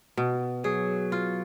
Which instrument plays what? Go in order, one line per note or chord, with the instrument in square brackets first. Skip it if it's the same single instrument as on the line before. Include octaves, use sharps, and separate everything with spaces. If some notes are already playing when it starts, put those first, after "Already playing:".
[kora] B2
[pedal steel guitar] F#3 [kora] G#4
[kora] F4